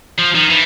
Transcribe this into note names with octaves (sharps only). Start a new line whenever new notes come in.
F3
D#3
E3